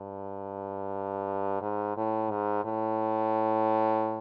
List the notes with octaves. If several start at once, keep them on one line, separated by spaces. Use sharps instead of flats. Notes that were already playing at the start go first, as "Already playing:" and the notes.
Already playing: G2
G#2
A2
G#2
A2